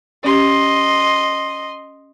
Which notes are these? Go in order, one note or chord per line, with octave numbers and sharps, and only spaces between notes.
C#4 G4 D#5 C6